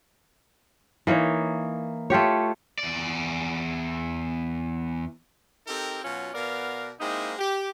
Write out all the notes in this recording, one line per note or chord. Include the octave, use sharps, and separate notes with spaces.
E3 A#3 D#4 C#5
A3 F4 G4 C#5
E2 D5
C4 D#4 G4 A4 A#4
B2 F#3 C#4 F4
B2 B3 A#4 D5 F5
G#3 A#3 C4 D#4 E4
G4